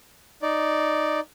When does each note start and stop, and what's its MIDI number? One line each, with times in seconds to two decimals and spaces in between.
0.42 1.20 63
0.42 1.20 74